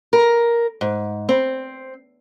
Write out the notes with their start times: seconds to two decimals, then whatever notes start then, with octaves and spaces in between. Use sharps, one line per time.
0.13 A#4
0.81 G#2
1.29 C4